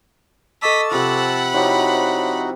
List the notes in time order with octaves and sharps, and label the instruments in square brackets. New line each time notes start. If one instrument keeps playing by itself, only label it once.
[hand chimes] A4 C#6 D6 [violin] D#5 B6 [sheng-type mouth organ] A5 E6
[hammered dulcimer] C3 F3 [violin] F#5 B5
[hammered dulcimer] F3 E4 G4 [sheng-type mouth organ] D#4 F#4 [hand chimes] C5 C#5 G5